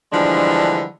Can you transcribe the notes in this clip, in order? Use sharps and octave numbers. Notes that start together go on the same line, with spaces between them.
D3 E3 F3 G3 G#3 D4